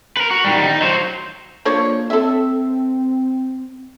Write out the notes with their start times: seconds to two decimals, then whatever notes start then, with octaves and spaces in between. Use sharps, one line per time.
0.17 A#4 B4
0.31 F#4
0.44 D#3 G3
0.67 D#4
0.82 F#3 C5
1.65 F3 A#3 D4 C#5
2.10 C4 A4 E5